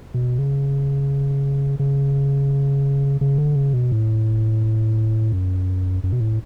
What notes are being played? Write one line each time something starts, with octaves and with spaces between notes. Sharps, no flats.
B2
C#3
C#3
C#3
D3
C#3
B2
A2
F#2
F#2
B2
A2